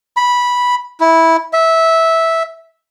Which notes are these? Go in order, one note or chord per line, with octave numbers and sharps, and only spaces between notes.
B5
E4
E5